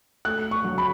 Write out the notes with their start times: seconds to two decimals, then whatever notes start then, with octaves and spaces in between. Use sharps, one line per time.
0.25 A3 F#6
0.51 C#6
0.64 F#3
0.78 B5